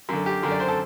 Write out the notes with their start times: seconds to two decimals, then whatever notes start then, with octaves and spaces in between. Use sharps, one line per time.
0.09 F#2 D3 A#4
0.26 G4
0.43 F#2 D3 A#4
0.51 D5
0.60 C5
0.68 A4